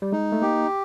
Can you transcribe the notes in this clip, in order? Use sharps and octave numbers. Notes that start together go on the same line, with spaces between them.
G3
G#3 D#4
A3
A#3 G4